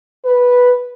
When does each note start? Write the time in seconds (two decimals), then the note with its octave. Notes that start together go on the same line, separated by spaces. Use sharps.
0.25 B4